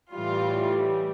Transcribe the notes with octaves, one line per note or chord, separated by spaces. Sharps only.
A2 E3 G3 F4